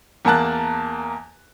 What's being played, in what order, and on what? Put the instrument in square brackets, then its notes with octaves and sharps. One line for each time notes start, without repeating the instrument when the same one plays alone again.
[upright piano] E2 A#3 A#4 A5 F#6